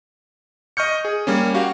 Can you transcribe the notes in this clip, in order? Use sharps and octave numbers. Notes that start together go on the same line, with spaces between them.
D#5 C#6 F6 G6 C#7
G#4
G3 A#3 C#4
F#4 G4 F5